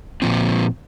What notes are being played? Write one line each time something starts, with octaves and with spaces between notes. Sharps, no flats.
A#2 F3 C4